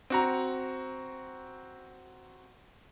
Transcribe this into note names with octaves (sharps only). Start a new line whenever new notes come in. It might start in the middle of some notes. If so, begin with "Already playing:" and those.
C4 F#4 A#5